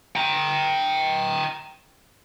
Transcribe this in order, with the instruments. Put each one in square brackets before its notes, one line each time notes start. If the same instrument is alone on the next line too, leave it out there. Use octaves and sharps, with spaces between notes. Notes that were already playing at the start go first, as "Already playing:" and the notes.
[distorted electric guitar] G5 A#5